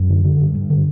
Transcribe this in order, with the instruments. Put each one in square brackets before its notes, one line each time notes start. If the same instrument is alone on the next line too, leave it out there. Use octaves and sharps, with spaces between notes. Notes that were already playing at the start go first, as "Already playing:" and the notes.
Already playing: [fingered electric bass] F#2 F#3
D3
D3
G2
G2
D3